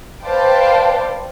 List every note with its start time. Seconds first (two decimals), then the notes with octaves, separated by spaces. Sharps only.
0.24 B4 C5 D5 F5 G5 A5